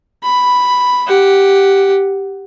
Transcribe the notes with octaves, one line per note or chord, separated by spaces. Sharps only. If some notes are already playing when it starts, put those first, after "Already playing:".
B5
G4 F#5